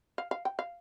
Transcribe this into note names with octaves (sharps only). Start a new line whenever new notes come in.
F5
F5
G5
F5